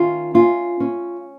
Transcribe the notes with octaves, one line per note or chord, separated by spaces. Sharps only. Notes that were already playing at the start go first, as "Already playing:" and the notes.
Already playing: D#3 C#4 F4
C#4 F4
C#4